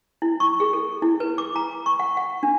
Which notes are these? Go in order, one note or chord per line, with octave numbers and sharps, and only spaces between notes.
E4
C#6
G#4
A4
E4
B4
D6
A#5
C#6
F#5
F#5
D4